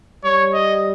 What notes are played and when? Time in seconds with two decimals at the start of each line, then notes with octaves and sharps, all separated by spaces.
0.24 G3 C#5
0.53 D#5